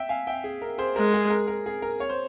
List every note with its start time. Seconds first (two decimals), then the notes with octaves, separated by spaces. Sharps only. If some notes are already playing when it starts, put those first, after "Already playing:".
Already playing: E5 G5
0.09 F5 G#5
0.27 E5 G5
0.44 G#4
0.62 A#4
0.78 G#4 C5
0.96 G#3 A#4
1.14 G#4
1.30 A#4
1.48 A#4
1.66 G#4
1.82 A#4
2.00 C#5
2.09 C5